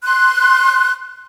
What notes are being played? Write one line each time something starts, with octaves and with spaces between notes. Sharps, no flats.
C6 F#6